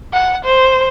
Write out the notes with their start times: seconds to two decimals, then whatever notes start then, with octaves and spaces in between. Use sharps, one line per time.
0.13 F#5
0.45 C5